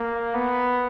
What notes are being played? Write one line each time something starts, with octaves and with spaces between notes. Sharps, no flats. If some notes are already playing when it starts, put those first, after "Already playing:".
Already playing: A#3
B3